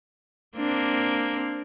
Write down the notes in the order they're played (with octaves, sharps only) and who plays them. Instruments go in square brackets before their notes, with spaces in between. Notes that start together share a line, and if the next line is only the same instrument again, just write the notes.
[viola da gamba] A#3 C4 D4